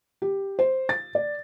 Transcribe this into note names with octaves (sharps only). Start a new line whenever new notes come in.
G4
C5
A6
D5